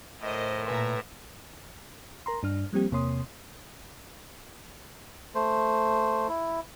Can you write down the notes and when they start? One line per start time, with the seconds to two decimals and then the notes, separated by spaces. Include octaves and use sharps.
0.19 A2 A#4 C5 D#5
0.67 A#2 B4 E5 G#5 A#5 C6
2.26 A#4 A#5 C6
2.43 G2 D4 F6
2.73 F3 G3 A#3 C4 G4
2.92 E2 C3 A#3 C#5 C6 D#6
5.35 A3 C5
6.29 E4